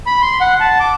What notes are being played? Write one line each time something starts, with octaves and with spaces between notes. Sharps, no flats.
B5
C6
F#5
A5
D6